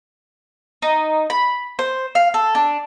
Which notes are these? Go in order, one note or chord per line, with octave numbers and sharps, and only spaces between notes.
D#4
B5
C5
F5
A4
D4